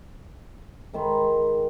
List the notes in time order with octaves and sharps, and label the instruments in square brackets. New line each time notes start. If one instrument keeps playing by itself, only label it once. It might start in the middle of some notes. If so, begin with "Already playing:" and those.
[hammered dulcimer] G#2 D#3 B5 C6